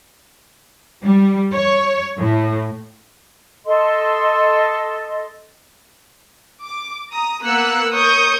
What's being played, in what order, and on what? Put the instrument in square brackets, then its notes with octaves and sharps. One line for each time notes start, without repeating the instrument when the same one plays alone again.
[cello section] G3
C#5
A2
[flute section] A4 D#5 C6
[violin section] D6
A#5 D#6
A#3 B3 E6 F#6 C#7
A#4 C#5 C#6 D#6 G6